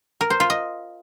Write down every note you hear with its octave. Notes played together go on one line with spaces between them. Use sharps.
A#4
C5
F4
D#5